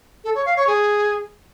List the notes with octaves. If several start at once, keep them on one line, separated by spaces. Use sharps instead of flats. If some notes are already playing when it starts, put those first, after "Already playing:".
A4
C#5
F5
C#5
G#4